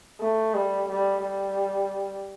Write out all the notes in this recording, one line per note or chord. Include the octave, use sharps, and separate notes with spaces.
A3
G3
G3
G3